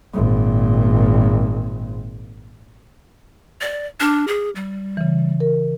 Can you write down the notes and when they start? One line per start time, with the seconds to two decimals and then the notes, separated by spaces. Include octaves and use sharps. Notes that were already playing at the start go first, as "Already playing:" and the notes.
0.14 G#1 A#2
3.61 D5
4.00 D4 D6 F6
4.28 G#4
4.56 G3
4.97 C#3 E3
5.40 A#4